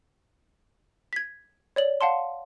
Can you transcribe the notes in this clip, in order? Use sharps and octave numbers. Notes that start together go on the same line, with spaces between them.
G#6 B6
C#5 D5 F#7
F5 F#5 A5 C6